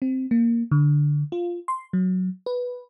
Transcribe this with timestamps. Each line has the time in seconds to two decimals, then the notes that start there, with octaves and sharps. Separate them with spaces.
0.02 C4
0.31 A#3
0.71 D3
1.32 F4
1.68 C6
1.93 F#3
2.46 B4